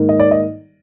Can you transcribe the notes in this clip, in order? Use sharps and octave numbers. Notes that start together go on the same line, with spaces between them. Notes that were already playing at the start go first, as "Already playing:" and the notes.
Already playing: G#2 D#3 A#3 D#4
D#5
D5
D#5